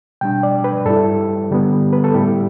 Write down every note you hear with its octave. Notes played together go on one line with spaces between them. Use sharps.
B2 G3 D4 G5
D5
B4
G2 G3 E4 A4
D3 G3 B3
B4
A4
A2 G3 E4 G4